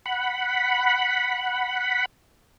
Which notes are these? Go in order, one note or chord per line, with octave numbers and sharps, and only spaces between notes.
F#5 B5